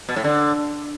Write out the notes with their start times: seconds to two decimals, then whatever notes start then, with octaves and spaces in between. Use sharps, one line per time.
0.09 B2
0.16 A2
0.24 D3